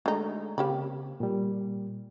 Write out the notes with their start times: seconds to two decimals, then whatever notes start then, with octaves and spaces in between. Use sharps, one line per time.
0.06 D3 G#3 A3 D#4
0.58 C#3 A#3 C4 G4 B5
1.20 A#2 G3